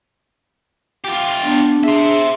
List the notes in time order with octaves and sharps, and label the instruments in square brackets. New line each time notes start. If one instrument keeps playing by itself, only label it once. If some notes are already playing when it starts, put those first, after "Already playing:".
[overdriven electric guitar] F4 G4
[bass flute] B3 [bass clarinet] D4
[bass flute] G#4 [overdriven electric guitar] C5 E5